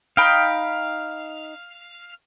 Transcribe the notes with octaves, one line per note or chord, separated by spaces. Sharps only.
D#4 F5 G5 B5